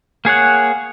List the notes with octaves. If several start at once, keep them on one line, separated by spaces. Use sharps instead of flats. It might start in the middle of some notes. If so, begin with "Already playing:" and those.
A#3 G#4 C#5 F#5